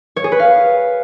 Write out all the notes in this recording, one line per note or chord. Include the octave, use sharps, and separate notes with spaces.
C#5
G#4
B4
F5